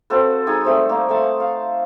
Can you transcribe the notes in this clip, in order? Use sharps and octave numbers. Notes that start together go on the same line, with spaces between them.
C4 F#4 A4 B4
G#3 D#4 G#5 D#6
G3 A3 C4
A#3
A3 F#5 G#5 A5
F5